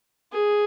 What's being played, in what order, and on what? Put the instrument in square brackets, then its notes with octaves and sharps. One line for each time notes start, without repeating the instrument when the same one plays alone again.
[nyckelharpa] G#4